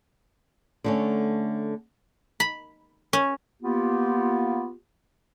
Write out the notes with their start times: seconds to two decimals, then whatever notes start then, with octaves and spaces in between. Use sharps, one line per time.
0.84 D3 A3 C#4
2.40 B5
3.13 C#4
3.62 A#3 B3 F4 G4